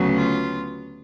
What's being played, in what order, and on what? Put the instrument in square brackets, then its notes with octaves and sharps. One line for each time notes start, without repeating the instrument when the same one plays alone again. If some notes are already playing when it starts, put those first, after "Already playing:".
Already playing: [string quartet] D2 C#3 F#3 B3
F4